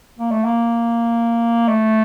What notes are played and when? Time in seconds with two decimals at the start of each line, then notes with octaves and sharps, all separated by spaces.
0.19 A#3
0.31 A3
0.45 A#3
1.68 A3